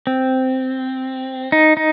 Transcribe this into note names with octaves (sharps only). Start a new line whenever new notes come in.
C4
D#4
D#4